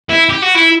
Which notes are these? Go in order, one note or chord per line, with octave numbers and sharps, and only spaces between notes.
E4
G4
F#4
E4